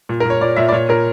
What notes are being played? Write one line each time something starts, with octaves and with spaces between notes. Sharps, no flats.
A#2
A#4
A#2 C#5
A#2 D5
A#2 E5
D5
A#2 C#5
A#2 A#4